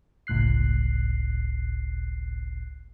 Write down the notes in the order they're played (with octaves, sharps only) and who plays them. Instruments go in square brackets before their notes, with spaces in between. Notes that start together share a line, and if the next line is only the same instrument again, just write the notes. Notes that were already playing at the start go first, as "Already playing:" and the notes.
[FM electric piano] G1 C#2 A2 F#6 C7